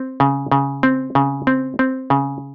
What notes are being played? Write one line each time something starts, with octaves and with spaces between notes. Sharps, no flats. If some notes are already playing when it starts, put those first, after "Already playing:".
Already playing: C4
C#3
C#3
C4
C#3
C4
C4
C#3